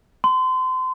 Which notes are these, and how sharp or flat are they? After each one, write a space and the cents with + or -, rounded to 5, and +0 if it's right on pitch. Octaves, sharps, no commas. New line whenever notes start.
C6 -30